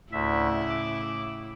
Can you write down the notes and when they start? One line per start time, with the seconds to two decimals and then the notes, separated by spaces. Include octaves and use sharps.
0.12 D2 A2 C#3 E4 E5
0.70 D6